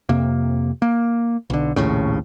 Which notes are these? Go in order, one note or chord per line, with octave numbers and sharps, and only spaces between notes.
F2 C3 A#3
A#3
B1 D3
A#1 D#2 A2 C#3